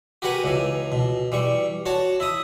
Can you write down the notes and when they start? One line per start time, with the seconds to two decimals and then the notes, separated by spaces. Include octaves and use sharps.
0.22 F#4 G4 A#4 B4 F#5 G#5
0.44 C#2 E3 G#5
0.92 B2
1.32 E3 G3 C#6
1.86 F#4 C#5 A5
2.20 E4 E5 D#6